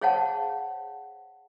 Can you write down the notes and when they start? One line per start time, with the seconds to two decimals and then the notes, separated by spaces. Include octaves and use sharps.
0.01 G#4 C5 C#5 F5 F#5 A5